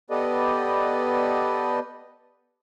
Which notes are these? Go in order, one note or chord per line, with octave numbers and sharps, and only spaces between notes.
B3 G4 A4 B4 D5 D#5